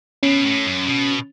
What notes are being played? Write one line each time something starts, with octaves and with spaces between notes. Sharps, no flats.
B2 C#4
A2
F#2
B2